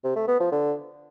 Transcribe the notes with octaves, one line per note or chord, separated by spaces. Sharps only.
C3
A3
B3
F3
D3